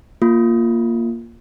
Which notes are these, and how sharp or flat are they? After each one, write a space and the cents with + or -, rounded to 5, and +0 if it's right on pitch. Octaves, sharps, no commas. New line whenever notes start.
A#3 +0 F4 +0